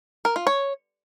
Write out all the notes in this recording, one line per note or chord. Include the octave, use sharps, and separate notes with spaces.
A#4
F4
C#5